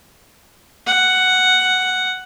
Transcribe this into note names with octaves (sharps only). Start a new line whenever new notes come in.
F#5